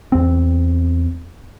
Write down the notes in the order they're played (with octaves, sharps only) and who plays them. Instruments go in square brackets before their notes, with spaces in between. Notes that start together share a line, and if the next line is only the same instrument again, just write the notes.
[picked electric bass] E2 C4